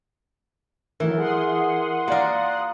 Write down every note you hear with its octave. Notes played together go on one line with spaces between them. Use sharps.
D#3 E3 F#3 A3 A#4
G#4 F#5 C6 D#6
A#3 F4 G4 A#4 D5